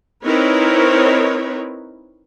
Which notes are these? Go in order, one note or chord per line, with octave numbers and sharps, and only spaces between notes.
C4 D#4 E4 A#4 B4 C#5